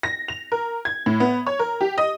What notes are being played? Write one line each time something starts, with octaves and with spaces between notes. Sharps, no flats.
A#6
F7
A#4
G#6
A2
B3
C#5
A#4
G4
D#5